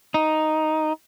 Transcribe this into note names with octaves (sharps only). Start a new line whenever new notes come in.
D#4